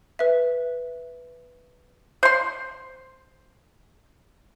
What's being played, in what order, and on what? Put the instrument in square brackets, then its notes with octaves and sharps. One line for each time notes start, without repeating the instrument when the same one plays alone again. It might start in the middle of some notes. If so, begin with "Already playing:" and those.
[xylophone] B4 E5
[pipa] C5 C6